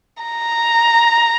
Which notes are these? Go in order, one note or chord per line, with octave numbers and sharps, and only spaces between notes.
A#5